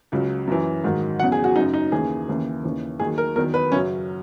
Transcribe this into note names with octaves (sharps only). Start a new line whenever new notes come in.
C#2 C#3 F#3
F#2 E3
G#2 D#3 F#3
E2 C#3 F#3 F#5
G#4
F#4
F#2 C#3 F#3 D#4
D#4
D#2 C#3 E3 G#4
D#2 C#3 E3
D#2 C#3 E3
D#2 D#3 F#3 G#4
A#4
E2 D#3 F#3 A#4
B4
F#2 C#3 F#3 C#4